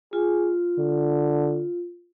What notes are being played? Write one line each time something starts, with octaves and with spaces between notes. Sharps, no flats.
F4 G#4
D3